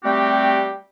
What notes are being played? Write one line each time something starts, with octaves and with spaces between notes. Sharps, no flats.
G3 A3 C4 F#4 G4